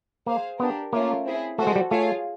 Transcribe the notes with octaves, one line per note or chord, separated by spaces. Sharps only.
A#3 G#4 C5 F5
B3 D4 G4 A#4
A3 A#3 C#4 F4 A#4 C#5
C4 E4 G#4
A3 F#4 A4 C5
G#3
G3
A3 F4 G#4 C#5 F5